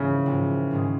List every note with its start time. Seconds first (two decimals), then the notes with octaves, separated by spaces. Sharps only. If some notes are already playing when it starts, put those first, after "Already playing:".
Already playing: A#1 G#2 C#3 E3
0.26 A#1 G#2 E3
0.71 G#2 D#3 G#3 C#4